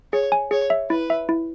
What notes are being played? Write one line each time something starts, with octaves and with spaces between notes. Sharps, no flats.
G#4 C#5
G#5
G#4 C#5
E5
E4 B4
E5
E4